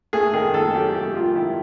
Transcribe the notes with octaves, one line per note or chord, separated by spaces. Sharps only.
A3 G#4
D#3 G#4
D#3 A4
F#3 G4
A3 G4
D#3 F4
D#3 E4